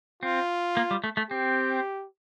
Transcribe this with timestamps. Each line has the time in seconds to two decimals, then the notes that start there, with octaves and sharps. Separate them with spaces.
0.23 C4 F4
0.77 A#3
0.91 G3
1.04 A3
1.17 A3
1.31 C4 G4